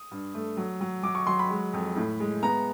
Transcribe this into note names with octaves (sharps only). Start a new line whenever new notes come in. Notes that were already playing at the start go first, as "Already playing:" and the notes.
Already playing: D#6
G2
A3
F#3
F#3
F#3 D6
C#6
F#3 C6
B5
G#3
F2
A2
G#3
B3 A#5